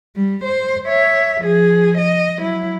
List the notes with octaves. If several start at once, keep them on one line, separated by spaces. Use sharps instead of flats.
G3
C5
C#5 E5
F3 G#4
D#5
F#3 E4